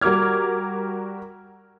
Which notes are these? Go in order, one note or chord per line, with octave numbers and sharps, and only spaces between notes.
G3 F#4 A#4 D6 F6 G#6